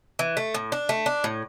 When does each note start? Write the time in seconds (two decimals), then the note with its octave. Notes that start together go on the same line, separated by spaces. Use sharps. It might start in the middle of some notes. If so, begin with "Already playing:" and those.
0.19 E3
0.37 A3
0.54 A2
0.72 D4
0.89 A3
1.06 D4
1.24 A2